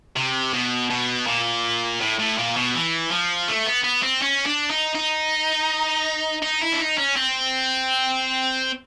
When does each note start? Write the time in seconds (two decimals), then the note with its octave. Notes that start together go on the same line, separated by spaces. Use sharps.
0.16 C3
0.53 B2
0.90 B2
1.27 A#2
2.00 A2
2.19 A2
2.38 A#2
2.56 B2
2.74 E3
3.11 F3
3.48 A3
3.66 B3
3.84 B3
4.03 C4
4.22 C#4
4.46 D4
4.70 D#4
4.95 D#4
6.42 D#4
6.61 E4
6.72 D4
6.80 D#4
6.98 C#4
7.16 C4